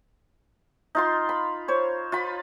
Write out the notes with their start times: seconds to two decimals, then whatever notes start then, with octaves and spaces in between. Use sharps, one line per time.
0.95 D#4 F4 C6
1.29 B5
1.68 C5 C#5
2.12 F4 B5